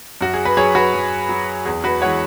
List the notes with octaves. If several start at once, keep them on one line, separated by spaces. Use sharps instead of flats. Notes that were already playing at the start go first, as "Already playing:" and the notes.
F#2 F#4
G#4
B4
F#3 G#4 C#5
F#4 B4
F#2
F#3
E2 G#4
F#4 B4
E3 G#3 C#5 F#5